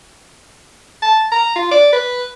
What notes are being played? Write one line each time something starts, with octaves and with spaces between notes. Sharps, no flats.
A5
A#5
F4
D5
B4